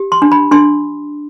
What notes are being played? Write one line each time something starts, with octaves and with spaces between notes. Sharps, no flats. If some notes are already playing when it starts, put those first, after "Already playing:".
Already playing: G4
C6
D4
B5
D4 C6